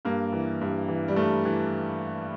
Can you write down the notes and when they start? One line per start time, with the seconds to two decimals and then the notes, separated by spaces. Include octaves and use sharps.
0.05 G2 A#3
0.33 E3
0.61 G2
0.88 E3
1.08 G3
1.16 G2 A3
1.45 E3